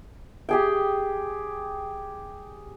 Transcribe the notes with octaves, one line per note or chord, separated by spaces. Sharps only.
G4 G#4 G5